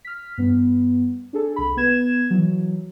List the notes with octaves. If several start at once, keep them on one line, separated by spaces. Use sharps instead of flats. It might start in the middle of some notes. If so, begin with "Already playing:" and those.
F6 B6
G2 B3
D4 G#4 A4
C2 B5
B3 B4 G#6 E7
E3 F#3